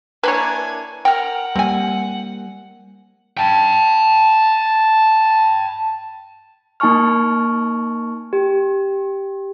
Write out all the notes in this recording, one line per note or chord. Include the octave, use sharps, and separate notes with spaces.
A#3 D4 E4 B4 C#5 G#5
A#4 F#5 G5 F6
G3 A#3 C4 G#5
G5 A5
A#3 D#4 G#5 A5 C#6 F6
G4